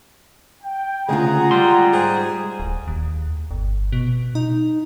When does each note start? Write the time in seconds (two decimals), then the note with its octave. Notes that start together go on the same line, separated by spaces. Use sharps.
0.63 G5
1.09 D2 C#3 G#3 F4 G#4 F#5 A#5
1.51 G3 C6
1.93 G#2 G#4
2.60 D1
2.88 D#2
3.51 G1
3.92 B2
4.35 D#4